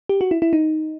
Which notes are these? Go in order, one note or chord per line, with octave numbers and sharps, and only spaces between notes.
G4
F#4
E4
E4
D#4